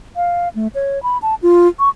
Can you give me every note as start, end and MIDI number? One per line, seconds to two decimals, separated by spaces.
0.16 0.49 77
0.55 0.68 57
0.75 1.01 73
1.03 1.18 83
1.22 1.35 81
1.43 1.68 65
1.79 1.89 85